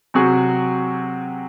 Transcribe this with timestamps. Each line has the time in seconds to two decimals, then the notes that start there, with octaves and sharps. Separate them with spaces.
0.14 C3 F#3 C4 F#4 G#4